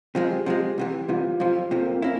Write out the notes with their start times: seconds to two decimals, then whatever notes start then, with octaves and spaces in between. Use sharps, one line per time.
0.15 C3 F3 G#3 G#4
0.30 G4
0.46 C3 F3 G#3
0.78 C2 C3 E3
1.08 C2 C3 E3 F4
1.40 F2 C3 F3
1.71 F2 C3 F3 C4
1.82 A#3
1.92 C4
2.02 A#3 C#4 E4